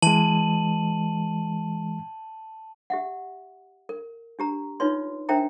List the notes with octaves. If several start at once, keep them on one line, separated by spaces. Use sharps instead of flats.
E3 G#3 A5 D#7 F#7
G4 E5 F#5
A#4
D4 G4 A#5
D#4 F4 B4 C#5 C6
D4 A#4 C5 E5 G5 A#5